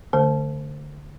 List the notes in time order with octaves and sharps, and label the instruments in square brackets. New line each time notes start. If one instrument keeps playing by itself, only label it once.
[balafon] D3 A3 C5